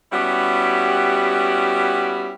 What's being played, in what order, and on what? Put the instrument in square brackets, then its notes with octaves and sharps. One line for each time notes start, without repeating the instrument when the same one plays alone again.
[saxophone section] G3 B3 C#4 E4 F#4 G4